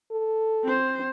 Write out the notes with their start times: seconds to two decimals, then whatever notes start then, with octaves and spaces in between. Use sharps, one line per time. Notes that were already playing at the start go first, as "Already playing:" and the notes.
0.11 A4
0.64 C4 C5